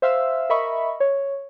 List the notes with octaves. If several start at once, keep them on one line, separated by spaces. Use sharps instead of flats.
C5 E5 F5 C6 E6
A#4 D#5 E5 B5 C#6
C#5